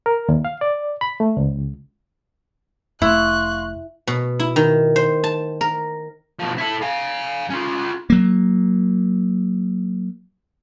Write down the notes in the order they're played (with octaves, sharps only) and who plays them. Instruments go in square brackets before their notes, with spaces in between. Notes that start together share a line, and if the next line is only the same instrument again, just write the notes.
[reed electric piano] A#4
D#2
F5
D5
B5
A3
C#2
[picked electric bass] F1 A3 [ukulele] E4 [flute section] F5 C6 C#6 [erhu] F#6
[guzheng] B2
E4
D#3
C5
A5
A#4
[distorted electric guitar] B2 F3
E4 A4
F5 G#5
C#4 F4
[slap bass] F#3 A#3